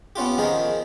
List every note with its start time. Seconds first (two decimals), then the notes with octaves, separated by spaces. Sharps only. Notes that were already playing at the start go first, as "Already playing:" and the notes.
0.16 B3 C#4 F4 G4
0.38 D#3 F3 G#4 A#4